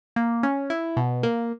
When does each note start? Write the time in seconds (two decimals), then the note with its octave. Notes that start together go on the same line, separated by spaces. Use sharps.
0.16 A#3
0.43 C#4
0.70 E4
0.97 B2
1.23 A#3